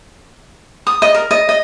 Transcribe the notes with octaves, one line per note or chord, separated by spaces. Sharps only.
D#6
D#5
A#4
D#5
D#5